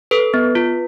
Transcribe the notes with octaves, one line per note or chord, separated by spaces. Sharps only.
A4 B4
B3
F4